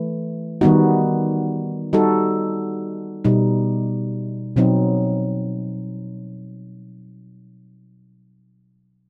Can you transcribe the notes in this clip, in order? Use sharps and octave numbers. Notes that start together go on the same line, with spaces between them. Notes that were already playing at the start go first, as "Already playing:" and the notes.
Already playing: E3 A3
D#3 G3 B3 D#4 F#4
G3 D#4 F#4 A4
B2 G3 D#4
B2 F#3 C4 D#4